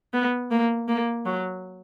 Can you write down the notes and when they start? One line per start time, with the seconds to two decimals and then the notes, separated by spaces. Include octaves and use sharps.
0.14 B3
0.51 A#3
0.88 A#3
1.25 F#3